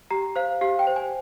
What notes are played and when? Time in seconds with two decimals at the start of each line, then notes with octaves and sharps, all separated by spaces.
0.11 G4 A#5
0.36 C5 F5
0.61 G4 F5
0.79 G5
0.87 C5
0.96 G#5